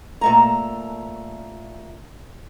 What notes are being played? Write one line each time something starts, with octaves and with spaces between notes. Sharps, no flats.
A#2 A3 A#5